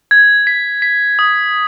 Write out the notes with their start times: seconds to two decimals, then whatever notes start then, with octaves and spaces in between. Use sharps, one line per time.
0.11 G#6
0.47 B6
0.82 B6
1.19 D#6